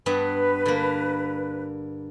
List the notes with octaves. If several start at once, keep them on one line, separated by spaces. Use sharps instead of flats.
G2 G3 B3 B4
D3 A#3